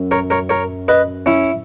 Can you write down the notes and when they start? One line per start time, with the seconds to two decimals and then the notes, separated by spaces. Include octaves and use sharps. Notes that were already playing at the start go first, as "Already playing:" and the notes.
Already playing: F#2
0.11 A#4 C#5
0.30 A#4 C#5
0.49 A#4 C#5
0.88 B4 D#5
1.26 C#4 E4